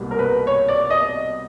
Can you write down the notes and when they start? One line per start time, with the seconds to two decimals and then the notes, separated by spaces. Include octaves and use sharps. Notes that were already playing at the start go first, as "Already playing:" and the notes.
Already playing: C2 B2 G3 A#3
0.11 A#4
0.19 B4
0.47 C#5
0.68 D5
0.90 D#5